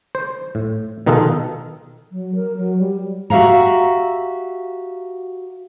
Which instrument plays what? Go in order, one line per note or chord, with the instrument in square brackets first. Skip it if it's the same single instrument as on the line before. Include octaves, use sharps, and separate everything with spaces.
[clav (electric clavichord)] C5
A2
B2 D#3 D#4 F4 G#4 A4
[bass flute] F#3
A#4
F#3
G3
[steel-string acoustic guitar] F#4 G4 E5 F5 A#5